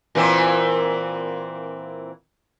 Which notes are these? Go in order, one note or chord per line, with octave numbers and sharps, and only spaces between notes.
A#2 E3 C4